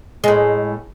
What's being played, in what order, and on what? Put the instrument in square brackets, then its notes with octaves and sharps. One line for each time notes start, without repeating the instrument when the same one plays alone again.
[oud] A2 G#3